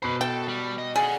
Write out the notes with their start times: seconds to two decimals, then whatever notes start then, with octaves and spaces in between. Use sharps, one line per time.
0.02 B2 B4 C5 B5
0.21 A4 G5
0.48 G3
0.78 D#5
0.96 G#4 D5 F#5 G#5